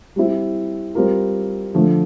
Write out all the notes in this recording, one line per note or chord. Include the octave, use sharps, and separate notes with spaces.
G3 C4 E4
G3 C4 F4 A#4
D3 F3 A3